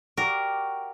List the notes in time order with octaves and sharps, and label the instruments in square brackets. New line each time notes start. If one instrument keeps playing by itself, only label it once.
[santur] F#4 G4 D5 [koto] A#4